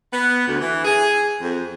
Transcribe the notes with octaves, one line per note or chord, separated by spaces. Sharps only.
B3
D2
E3
G#4
F2